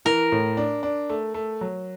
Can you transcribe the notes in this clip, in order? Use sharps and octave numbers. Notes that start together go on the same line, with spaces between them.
E3 A#4
A2
D4
D4
A3
A3
F#3